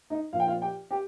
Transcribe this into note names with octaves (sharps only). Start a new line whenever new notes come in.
D#4 D#5
A#2 F3 F5
G5
F4 F5
G4 G5
G4 G5